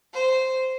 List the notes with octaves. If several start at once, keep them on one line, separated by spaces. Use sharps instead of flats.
C5